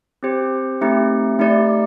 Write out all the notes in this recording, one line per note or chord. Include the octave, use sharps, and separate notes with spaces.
C4 G4 C5
A3 C4 D#4 G4
A3 D#4 G4 D5